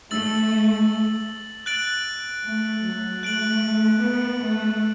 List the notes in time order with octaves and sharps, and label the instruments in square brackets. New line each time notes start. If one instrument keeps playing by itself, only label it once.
[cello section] A3 [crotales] E6 A6 F#7
[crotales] F#6 A6 D7 F#7
[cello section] A3
F#3
[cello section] A3 [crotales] F#6 D7 F#7
[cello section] B3
A3